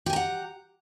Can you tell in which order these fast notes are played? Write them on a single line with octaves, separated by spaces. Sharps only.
G4 G#5 A#5 F#5